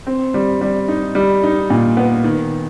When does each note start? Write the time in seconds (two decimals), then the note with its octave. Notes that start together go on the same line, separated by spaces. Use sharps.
0.07 C4
0.34 G3
0.61 G3
0.88 D#4
1.15 G3
1.43 D#4
1.70 A#2
1.97 B3
2.24 D#3